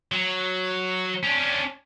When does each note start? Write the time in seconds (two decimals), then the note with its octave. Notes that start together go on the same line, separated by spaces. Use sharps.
0.12 F#3
1.23 C#4 D4